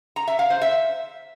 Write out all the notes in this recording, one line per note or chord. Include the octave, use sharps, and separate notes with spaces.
A#5
E5
F5
C5
E5